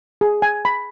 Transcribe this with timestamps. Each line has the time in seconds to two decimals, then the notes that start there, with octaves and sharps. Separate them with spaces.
0.21 G#4
0.42 G#5
0.65 B5